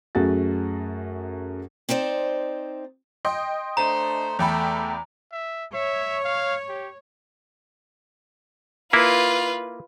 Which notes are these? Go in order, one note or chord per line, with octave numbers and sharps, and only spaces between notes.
F#2 A3 F#4 G#4 A6
C4 D#4 C5 D5
D#5 G5 C6
A3 D4 C5 A#5
E2 A3 G5 B5
E5
C#5 E5
F5
G4
A#3 E4 F4 B4